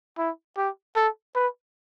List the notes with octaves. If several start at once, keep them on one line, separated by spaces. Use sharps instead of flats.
E4
G4
A4
B4